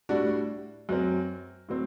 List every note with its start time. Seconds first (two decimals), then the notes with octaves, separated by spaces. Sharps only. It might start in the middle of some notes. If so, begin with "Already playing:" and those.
0.09 A2 G3 D4 F#4
0.89 F#2 F#3 C4
1.68 A2 F#3 C4